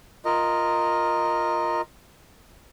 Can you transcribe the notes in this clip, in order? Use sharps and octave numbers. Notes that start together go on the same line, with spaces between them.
F4 A#4 D#5